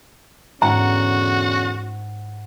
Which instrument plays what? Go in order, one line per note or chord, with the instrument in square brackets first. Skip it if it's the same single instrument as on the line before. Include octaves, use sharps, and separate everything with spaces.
[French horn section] E2 D3 C#4 [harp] G#2 F#5 [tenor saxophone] F#4 [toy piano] A#5